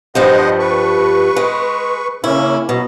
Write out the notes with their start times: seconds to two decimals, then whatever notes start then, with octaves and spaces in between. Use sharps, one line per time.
0.15 G2 F3 G3 C5 D#5 F#5
0.59 B4 C#6
1.37 G#3
2.24 C#3 A#3 C#4 E4
2.69 B2 F#3